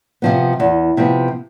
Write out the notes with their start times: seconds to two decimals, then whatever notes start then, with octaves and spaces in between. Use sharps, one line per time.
0.22 C3 F3 B3
0.60 E2
0.97 C3 F3 B3